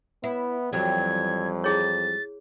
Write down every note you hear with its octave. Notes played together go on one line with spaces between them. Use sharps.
B3 E4
F2 E3 F#3 G3 G#6
E4 G#4 C#5 A6